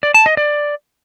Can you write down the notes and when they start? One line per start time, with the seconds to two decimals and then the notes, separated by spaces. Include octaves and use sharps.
0.03 D5
0.14 A5
0.26 D#5
0.37 D5